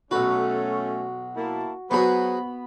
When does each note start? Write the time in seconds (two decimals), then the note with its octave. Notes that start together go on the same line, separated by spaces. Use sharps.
0.11 B1 A3 C#4 F#4 B4
1.35 A#3 E4 A5
1.91 F#3 B3 F#4 G#4 B4 C5 B5